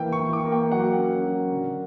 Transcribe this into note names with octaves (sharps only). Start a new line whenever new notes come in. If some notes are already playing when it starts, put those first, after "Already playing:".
Already playing: E3 A#3 G5
C#6
E3
D6
A#3
G5
F#3 F#5
C#4
F#3
D3